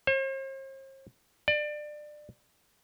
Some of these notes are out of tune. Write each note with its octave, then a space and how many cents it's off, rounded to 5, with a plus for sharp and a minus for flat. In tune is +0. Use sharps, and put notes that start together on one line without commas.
C5 +45
D5 +25